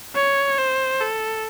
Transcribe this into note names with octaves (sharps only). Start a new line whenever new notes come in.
C#5
C5
A4